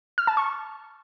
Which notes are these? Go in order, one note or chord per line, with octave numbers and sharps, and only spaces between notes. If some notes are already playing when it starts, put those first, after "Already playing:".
F6
A5
C#6